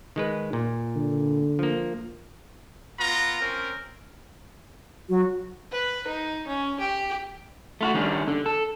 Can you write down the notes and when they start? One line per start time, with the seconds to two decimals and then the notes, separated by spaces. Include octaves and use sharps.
0.16 D#3 G#3 B4
0.53 A#2
0.96 D3
1.59 F3 A#3
2.98 B3 F4 A#5
3.40 C4 C#4 A#4
5.09 F#3 F#4
5.71 B4
6.08 D#4
6.47 C#4
6.80 G4
7.81 A3 F4 F#4
7.94 D#3 G3 C#4 D4
8.28 D3
8.46 A4